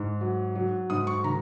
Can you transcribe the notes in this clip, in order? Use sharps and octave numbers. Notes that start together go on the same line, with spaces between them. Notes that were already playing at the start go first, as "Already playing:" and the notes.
Already playing: G#2
F#3
F#3
G#2 D#6
C#6
D#3 A#5